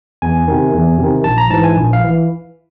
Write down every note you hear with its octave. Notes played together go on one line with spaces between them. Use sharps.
E2 G#5
C3 D#3
E2
C3 D#3
A#1 A5
A#5
G#2 E3 A5
G#5
A#1
F5
E3